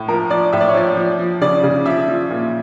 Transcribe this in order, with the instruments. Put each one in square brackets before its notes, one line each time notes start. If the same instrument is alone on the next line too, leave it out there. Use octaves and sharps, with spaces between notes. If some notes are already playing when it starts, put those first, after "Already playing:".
Already playing: [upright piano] A2
F3 A#4
F3 D5
A2 E5
D5
C#5
F3 D5
F3
F3
C#3 D5
C#3
F3 E5
F3
A#2